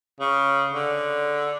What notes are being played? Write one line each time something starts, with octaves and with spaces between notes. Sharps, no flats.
C#3
D3